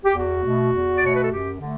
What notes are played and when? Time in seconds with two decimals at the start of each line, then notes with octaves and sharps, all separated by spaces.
0.05 G4
0.16 E2 F#4
0.45 B2 A3
0.73 E2
0.97 D5
1.03 B2 A3 C#5
1.15 B4
1.23 A4
1.31 F#2 G4
1.61 D3 A3